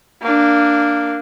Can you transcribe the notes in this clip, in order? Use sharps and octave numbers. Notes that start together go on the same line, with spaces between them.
A#3 D4